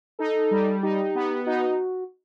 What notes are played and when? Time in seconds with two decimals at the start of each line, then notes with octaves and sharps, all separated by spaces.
0.19 D#4 A4
0.51 G3
0.83 D#4 G4
1.15 B3
1.47 D#4 F#4